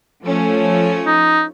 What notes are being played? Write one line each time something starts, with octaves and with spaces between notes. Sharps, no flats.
F3 A3 C#4
D#4